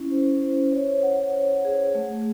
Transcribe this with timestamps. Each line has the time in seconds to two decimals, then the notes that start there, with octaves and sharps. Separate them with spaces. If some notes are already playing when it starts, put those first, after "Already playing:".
Already playing: C#4 E4
0.11 C5
0.42 C5
0.72 C#5
1.03 F#5
1.34 C#5
1.65 G#4
1.95 A3